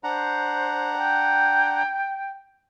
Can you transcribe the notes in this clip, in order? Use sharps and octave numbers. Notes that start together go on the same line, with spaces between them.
D4 C5 F#5 A#5
G5